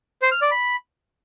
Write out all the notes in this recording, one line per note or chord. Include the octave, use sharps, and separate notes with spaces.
C5
F6
D5
B5